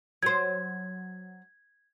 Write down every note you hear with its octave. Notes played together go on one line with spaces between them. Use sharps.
F#3 C5 G#6